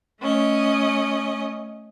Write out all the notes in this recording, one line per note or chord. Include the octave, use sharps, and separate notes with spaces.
A3 C#4 D#5